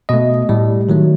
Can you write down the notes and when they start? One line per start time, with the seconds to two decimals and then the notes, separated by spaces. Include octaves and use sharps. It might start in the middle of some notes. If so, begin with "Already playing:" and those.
0.09 B2 A3 D#5
0.49 A2 G3
0.89 D#3 F#3 A3